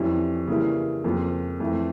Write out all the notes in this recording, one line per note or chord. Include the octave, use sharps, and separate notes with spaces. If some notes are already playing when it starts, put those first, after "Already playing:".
Already playing: F2 E3 G3 C#4 E4
C#3 E3 G3 A#3 E4
F2 C#3 F3 A#3
F2 E3 A3